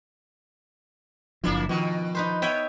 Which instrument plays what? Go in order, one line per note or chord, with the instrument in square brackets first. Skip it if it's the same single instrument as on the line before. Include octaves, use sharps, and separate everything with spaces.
[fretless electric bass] F#1 F3 [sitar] A#3 D4 E4
[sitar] B2 D#3 [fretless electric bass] F3
[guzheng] D#4 B4 C5
[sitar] B3 [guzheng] C#5 E5 G5